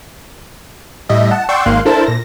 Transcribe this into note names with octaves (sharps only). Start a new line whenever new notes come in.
A2 G3 D#5 E5
F#5 A5
D5 F#5 G5 C6 C#6 E6
G#1 G#2 A#3 F5 C6 F#6
D4 E4 A4 A#4 C5 A5
A#2 A#6